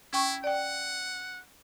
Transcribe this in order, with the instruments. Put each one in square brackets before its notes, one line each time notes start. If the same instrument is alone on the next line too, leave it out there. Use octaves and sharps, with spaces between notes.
[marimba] C#4 G5 C#6 [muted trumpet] E4
[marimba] D5 G5 [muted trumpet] F#5